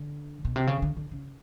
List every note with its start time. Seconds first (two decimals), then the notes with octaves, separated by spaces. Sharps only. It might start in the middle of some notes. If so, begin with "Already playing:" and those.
Already playing: D3
0.45 B2
0.56 C3
0.67 C#3
0.82 D3
0.97 D3
1.11 C#3